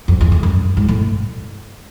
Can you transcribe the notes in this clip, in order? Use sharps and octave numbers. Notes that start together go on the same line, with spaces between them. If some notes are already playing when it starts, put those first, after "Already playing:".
F2
E2
F2
F#2
G#2
A2